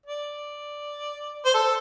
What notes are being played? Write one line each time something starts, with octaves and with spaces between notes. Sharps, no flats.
D5
C5
A4